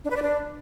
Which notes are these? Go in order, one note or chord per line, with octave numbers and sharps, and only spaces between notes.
D4
B4
D5
D4